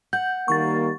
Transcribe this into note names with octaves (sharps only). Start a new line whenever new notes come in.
F#5 G6
D#3 G3 A#3 C#6 A6